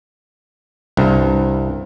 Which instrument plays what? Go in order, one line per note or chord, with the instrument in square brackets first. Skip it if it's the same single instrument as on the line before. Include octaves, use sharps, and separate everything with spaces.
[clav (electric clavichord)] C2 G2